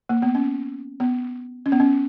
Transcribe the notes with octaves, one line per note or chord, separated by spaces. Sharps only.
A#3
B3
C#4
B3
C#4
B3
C#4